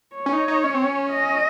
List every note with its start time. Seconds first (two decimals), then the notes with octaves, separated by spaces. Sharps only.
0.16 C#5
0.26 C#4
0.33 D#4
0.48 D#4
0.64 C#4
0.74 C4
0.85 C#4
1.11 D#5